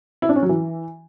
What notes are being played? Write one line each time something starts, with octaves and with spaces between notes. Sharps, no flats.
E4
D4
C#4
F#3
E3